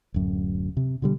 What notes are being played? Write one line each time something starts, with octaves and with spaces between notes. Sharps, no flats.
D1 F#2
C3
B2 D3 G3